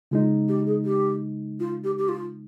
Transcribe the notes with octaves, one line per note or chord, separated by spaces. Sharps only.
C#3 G#3 D#4 F4
G4
G#4
G4
F4
G4
G4
F4